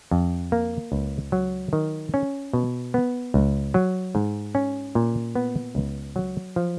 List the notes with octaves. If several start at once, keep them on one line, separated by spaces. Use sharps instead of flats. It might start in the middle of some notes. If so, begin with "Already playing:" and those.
F2
A#3
C#2
F#3
D#3
C#4
B2
B3
C#2
F#3
G#2
C#4
A#2
B3
C#2
F#3
F3